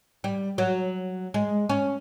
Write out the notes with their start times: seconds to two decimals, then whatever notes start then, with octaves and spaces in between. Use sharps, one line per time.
0.24 G3
0.58 F#3
1.34 G#3
1.69 C#4